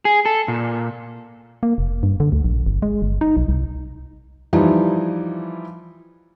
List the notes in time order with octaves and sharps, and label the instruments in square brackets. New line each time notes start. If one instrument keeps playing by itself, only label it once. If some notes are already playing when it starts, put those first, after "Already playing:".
[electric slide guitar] G#4
A4
A#2
[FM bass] A#3
F1
G2
D3
D2
A#1
G1
G#3
G1
D#4
B1
C2
[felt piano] E3 F3 G3 D#4 E4